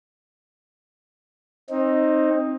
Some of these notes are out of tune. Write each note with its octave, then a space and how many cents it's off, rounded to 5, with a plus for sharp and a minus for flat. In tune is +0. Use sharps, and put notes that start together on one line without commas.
C4 +20 D#4 +0